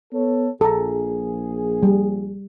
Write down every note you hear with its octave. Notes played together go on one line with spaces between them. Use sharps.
B3 A4 C#5
A#1 G#4 A4 A#5
G3